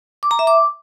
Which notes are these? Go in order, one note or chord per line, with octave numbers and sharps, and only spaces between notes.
D6
A#5
E5
D6